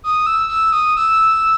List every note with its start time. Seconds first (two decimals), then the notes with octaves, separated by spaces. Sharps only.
0.04 D#6
0.27 E6
0.49 E6
0.72 D#6
0.97 E6